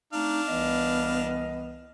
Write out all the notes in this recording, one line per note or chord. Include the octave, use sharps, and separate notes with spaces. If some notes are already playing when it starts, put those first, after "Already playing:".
A3 C4 D4 D#4 F5
C2 E3 B3 D#5